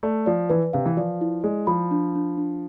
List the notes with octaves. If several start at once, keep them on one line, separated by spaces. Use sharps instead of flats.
A3 D5
F3 D5
E3 B4
C3 F5
E3
F3 D5
E4
G#3 D5
F3 B5
D4
D4
D4